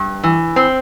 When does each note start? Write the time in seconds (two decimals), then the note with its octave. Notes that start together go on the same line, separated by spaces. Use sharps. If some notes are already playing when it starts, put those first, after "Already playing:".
Already playing: G2
0.23 E3
0.56 C4